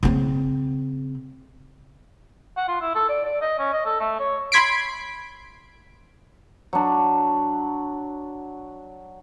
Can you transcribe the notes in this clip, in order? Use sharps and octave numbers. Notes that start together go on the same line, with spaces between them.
C#3 C4
F#5
F4
E4
A4
D5
D5
D#5
C#4
D#5
A4
A3
C#5
B5 C6 G#6 B6 C7 D7
F#3 D4